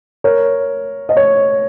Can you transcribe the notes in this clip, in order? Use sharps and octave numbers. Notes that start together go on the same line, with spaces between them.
A#4 C#5
D#5
C#5